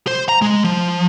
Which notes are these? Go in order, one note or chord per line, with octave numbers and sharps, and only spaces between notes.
C5
A#5
G#3
F3